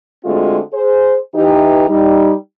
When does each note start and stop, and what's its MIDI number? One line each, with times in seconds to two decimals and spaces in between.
0.25 0.59 50
0.25 0.59 56
0.25 0.59 57
0.25 0.59 60
0.25 0.59 65
0.25 0.59 66
0.73 1.16 68
0.73 1.16 72
1.35 1.86 52
1.35 1.86 63
1.35 1.86 67
1.88 2.32 55
1.88 2.32 63